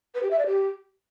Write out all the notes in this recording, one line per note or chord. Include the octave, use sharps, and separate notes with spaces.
B4
G4
E5
D5
G4